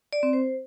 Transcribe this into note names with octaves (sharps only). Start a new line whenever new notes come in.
D5
C4
C5